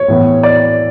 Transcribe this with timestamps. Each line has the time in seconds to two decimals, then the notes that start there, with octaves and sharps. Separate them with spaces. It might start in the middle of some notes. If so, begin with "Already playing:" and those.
Already playing: C#5
0.08 A2 E3 B3
0.43 D5